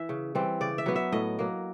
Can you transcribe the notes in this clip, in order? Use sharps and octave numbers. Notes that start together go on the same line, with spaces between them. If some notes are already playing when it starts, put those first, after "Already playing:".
Already playing: E3 E5
C#3
E3 G3 C4
C#3 D5
E5
F#3 B3
E5
A2 D#5
F#3 A#3